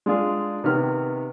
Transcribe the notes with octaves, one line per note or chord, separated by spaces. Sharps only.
G#3 D4 F4 G#4
C3 D#3 B3 F6